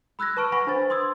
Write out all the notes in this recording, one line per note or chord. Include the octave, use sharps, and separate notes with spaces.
B5 E6 F#6 G#6 A#6
B4 A5 C#6 F6 D7
F#5 G#5 B5 C#6 A#6
D4 B4 C5 A6
C6 D#6 E6 G#6